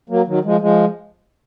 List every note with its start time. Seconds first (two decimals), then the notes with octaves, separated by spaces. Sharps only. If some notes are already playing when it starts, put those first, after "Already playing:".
0.10 F#3 A#3
0.27 D#3 F#3
0.45 F3 G#3
0.61 F3 G#3